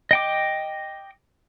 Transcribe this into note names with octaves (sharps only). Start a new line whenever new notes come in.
D#5 G5 D6